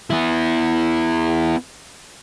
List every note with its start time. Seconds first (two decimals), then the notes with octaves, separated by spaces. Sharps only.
0.10 B3 E4